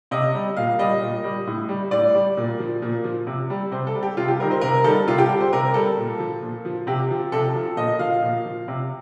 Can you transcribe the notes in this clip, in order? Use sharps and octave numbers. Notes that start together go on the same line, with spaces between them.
C3 D#5
G3
A#2 F5
G3 D#5
A#2
G3
A2
G3
A2 D5
G3
A#2
F3
A#2
F3
C3
G3
C3 C5
A4
G3
G4
C3 F4
G4
D#3 G3 A#4
C5
C3 A#4
D#3 G3 A4
C3 F4
G4
G3 G4
C5
C3 A#4
G3 A4
A#2
F3
A#2
F3
C3 G4
F3
C3 A4
F3
A#2 D#5
F3 F5
A#2
F3
C3